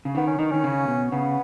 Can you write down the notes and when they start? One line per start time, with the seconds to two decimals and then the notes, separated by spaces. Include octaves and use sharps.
0.05 C#3
0.15 D#3 B3
0.27 C#4
0.39 D#3 D#4
0.51 D#3 C#4
0.64 C#3
0.88 B2
1.12 C#3 B3